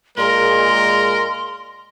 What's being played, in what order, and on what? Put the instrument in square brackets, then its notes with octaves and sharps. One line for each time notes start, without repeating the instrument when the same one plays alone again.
[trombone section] A#2 G#3 [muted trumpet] A#4 [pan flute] C6